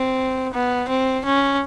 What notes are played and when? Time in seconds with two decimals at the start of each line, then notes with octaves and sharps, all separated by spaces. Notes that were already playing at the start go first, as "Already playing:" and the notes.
Already playing: C4
0.54 B3
0.90 C4
1.25 C#4